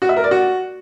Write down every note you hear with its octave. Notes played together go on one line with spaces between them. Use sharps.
F#4
E5
A#4
D5
F#4